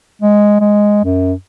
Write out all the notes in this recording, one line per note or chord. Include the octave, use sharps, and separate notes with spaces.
G#3
G#3
F#2